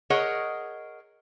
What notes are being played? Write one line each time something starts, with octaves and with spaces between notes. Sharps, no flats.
G#4 A#4 C#5 D#5 F#5